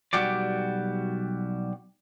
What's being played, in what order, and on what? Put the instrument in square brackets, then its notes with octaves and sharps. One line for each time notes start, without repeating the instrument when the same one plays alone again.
[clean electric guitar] B1 G3 F#4 G4 D5